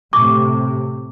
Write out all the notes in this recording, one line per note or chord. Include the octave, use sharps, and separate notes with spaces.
A2 C3 C#6 D6